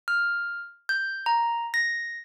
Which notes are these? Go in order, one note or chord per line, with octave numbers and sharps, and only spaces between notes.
F6
G6
A#5
A#6